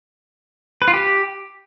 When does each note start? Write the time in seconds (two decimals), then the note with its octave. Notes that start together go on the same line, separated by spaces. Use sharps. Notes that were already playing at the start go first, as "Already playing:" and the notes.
0.82 B4
0.88 F4
0.94 G4